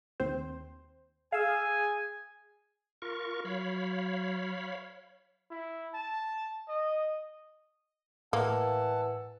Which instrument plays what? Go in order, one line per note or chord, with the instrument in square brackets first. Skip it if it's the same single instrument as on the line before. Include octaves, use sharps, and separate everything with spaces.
[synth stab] D#2 C4 C5
[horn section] G#4 G#5 [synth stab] F5 E6
[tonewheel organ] F4 A#4 C#6
[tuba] F#3 [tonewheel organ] C#5 F5 B5
[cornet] E4
A5
D#5
[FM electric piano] A2 [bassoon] E3 [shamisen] A#3 [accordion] F#5 A5 E6